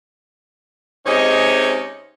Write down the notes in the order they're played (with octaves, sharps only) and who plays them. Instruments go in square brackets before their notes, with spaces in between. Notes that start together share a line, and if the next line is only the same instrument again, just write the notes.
[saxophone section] C3 G#3 C#4 D#4 C#5 D#5